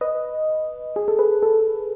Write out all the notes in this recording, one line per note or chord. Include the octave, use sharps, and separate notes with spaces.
B4 D#5
G#4
A4
G#4 B4
A4